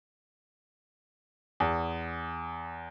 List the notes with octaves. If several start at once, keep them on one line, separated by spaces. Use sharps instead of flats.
E2